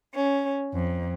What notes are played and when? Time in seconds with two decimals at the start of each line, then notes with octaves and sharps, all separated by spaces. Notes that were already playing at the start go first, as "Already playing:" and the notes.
0.13 C#4
0.73 F2